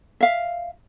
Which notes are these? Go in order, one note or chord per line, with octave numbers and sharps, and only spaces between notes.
E5 F5